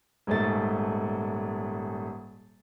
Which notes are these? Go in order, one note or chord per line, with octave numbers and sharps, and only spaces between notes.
D#1 G#2 A3 A6